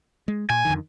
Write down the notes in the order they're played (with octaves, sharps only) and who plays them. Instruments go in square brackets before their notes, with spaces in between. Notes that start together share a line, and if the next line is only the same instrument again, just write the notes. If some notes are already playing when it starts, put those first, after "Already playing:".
[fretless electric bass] G#3
[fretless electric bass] A#2 [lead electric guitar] G#5
[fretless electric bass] F2 D3 D#3